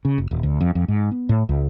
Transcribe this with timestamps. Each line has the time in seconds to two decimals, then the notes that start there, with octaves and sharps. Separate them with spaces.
0.05 C#3
0.18 F#1
0.31 D#1
0.43 D2
0.61 F2
0.75 F2
0.88 G#2
1.11 B3
1.29 A2
1.49 C#2